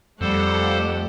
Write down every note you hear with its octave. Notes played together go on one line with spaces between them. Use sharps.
F2 G3 A3 G4 A4 C5 F#5